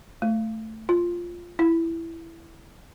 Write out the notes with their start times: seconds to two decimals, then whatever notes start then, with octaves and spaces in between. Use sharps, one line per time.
0.22 A3
0.89 F4
1.59 E4